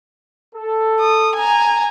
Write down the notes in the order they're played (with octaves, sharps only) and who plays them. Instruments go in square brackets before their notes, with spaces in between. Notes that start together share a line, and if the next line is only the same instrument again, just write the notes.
[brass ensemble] A4
[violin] D#6
G#5 A#5